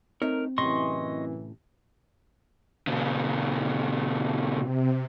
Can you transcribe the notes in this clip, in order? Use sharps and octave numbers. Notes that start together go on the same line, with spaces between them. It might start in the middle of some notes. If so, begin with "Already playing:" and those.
A3 C4 D#4 A#4 C#5
F#2 A2 C3 E3 C#4 D#5 C6 C#6
A#2 C#3
C3